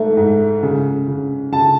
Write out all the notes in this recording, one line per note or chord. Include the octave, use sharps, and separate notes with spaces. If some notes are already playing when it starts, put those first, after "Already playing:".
Already playing: G#2 A3
G#2
C#3
C#3
C#3 A5